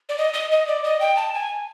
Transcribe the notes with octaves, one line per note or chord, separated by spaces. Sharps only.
D5
D#5
D#5
D#5
D5
D#5
G5
A5
G#5